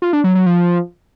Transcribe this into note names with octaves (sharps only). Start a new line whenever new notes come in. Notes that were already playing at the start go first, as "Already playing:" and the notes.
F4
D4
F#3
F#3
F3